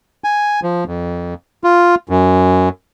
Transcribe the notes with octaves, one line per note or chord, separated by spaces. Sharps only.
G#5
F3
F2
F4
F#2